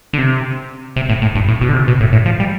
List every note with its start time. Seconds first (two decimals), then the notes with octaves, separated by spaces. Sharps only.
0.13 D3
0.18 C3
0.96 C3
1.09 A2
1.22 A2
1.35 G2
1.48 A2
1.61 B2
1.69 D3
1.74 C3
1.88 B2
2.00 A2
2.13 A2
2.26 F3
2.40 G3